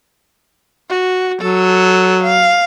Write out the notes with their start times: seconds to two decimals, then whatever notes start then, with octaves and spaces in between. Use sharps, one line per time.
0.89 F#4
1.41 F#3 A4
2.23 F5